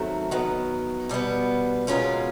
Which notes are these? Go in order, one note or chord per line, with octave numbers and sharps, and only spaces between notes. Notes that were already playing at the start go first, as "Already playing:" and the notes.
Already playing: D#3 F#3 A3 C4
D#3 F#3 B3
B2 G3 B3
B2 G#3 C#4 F4 A#4